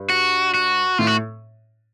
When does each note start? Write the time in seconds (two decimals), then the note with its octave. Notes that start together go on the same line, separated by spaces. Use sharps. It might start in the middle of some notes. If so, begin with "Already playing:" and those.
Already playing: G2
0.10 F#4
0.54 F#4
0.98 A2 F4
1.07 F#4